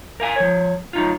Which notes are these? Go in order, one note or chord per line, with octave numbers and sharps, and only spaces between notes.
A#4 F5 G#5
F3 C#5
F#3 D#4 F4